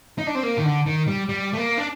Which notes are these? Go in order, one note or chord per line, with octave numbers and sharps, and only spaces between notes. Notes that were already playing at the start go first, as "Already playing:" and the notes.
D#4
D4
C4
A#3
D#3
D3
D#3
G3
G3
A3
A#3
D4